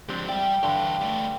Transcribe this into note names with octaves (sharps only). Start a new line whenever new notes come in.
F3 G#3 C4 D4 G4
G3 D5 E5 G5
G2 D3 E3 G4
G3 A3